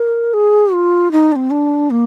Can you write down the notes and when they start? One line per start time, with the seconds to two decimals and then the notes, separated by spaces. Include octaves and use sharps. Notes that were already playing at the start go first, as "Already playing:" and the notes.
Already playing: A#4
0.34 G#4
0.73 F4
1.12 D#4
1.32 D4
1.36 C4
1.51 D4
1.90 A#3